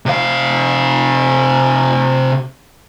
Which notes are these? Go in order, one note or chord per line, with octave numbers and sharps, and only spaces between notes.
C3 F5